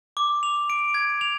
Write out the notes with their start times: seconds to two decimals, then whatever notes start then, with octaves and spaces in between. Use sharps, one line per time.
0.17 D6
0.43 F7
0.70 D7
0.94 G#6
1.21 F7